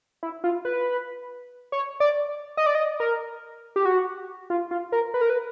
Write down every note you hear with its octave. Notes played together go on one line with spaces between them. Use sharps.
E4
F4
B4
C#5
D5
D#5
D5
D#5
A#4
G4
F#4
F4
F4
A#4
B4
A#4
B4